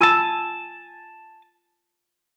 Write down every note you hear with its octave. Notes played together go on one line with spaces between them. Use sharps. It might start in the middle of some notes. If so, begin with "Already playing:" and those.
F4 G#5 A5 B5 E6